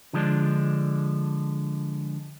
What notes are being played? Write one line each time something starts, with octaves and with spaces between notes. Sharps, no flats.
D3 F3 G#3 D4